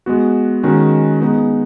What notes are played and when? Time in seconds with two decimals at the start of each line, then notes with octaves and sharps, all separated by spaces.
0.06 G#3 B3 F#4
0.63 D#3 G#3 C#4 F#4
1.20 G#3 B3 D#4